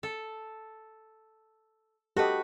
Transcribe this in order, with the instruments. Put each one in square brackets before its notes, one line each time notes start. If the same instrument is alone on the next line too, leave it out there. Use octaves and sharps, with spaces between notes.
[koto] A4
[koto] F#4 B4 [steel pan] G4 A4 D#5